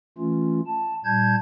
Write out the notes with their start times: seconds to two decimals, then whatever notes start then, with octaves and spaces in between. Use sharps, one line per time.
0.18 E3 A3 C#4 F4
0.67 A5
1.05 A#2 G3 A5 G6 G#6